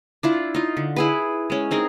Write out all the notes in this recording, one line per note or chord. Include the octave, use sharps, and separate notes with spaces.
D4 E4 F4
D#4 F4
D3
E4 G#4 B4
G#3 C#4
C4 D#4 G#4 A#4